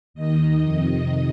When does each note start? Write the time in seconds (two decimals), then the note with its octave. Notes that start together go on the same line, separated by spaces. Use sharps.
0.14 D#2 D#3 D#5
0.62 F2 C3 D#3